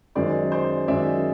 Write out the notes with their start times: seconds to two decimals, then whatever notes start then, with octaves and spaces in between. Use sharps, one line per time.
0.15 F#2 D#3 G#3 C5 D5
0.52 C5 D5
0.88 F#2 D#3 G#3 D5 E5